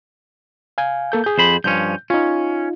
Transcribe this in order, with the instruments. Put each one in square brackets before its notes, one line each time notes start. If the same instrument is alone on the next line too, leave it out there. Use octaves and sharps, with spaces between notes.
[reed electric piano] F5 G#5
A#3 A4 G6
G#4 G6
[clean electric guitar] F2 C5 B5
[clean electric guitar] G2 F3 C#4 [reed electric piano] G6
[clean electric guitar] C#4 [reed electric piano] D#4 F4